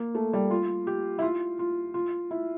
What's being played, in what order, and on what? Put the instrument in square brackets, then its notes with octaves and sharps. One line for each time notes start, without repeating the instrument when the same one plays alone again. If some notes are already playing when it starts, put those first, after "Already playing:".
Already playing: [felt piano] A#3
A3
G3
F4
G4
E4
F4
F4
F4
E4